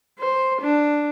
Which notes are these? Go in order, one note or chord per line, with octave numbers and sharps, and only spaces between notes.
C5
D4